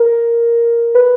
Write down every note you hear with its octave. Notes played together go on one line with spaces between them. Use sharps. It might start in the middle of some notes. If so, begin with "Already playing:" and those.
Already playing: A#4
B4